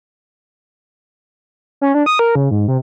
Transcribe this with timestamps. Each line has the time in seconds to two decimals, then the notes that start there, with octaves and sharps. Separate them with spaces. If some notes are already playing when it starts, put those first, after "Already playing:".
1.81 C#4
1.94 D4
2.06 D#6
2.19 A#4
2.35 C#3
2.51 G#2
2.68 C3